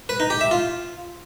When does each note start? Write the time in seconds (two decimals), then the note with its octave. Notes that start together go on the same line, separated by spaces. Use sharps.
0.09 B4
0.20 D#4
0.30 G4
0.41 E5
0.51 F4